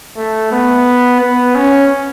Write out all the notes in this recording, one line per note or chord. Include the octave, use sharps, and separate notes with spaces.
A3
B3
B3
C#4